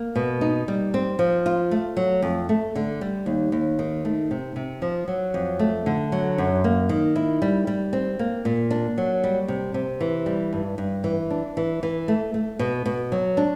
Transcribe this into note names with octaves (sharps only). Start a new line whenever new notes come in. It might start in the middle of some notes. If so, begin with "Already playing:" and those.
Already playing: A#3
B2
D#4
G3
C4
F3
F4
A3
F#3
F2
A3
D3
G3
D#2
D#2
D#3
A3
C3
C3
F3
F#3
F2
A3
D3
F#3
F#2
A#3
D#3
E4
G3
G3
C4
A#3
A#2
D4
F#3
G3
C3
C3
E3
G3
G2
G2
E3
D4
E3
E3
A3
A3
B2
B2
F#3
D4